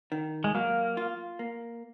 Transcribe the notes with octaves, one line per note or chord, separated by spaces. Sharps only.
D#3
G#3
F#3 A#3
F4
A#3